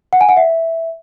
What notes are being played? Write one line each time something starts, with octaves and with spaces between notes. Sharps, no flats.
F#5
G#5
F#5
E5